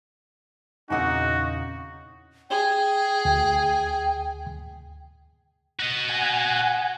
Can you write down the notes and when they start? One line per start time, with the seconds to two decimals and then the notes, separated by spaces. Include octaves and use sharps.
0.90 E2 A#2 C#3 C4 D#4 F#4 E5 F#5
2.50 G#4 G5
3.25 D2
5.80 F#4 D#5
6.09 F#5 G#5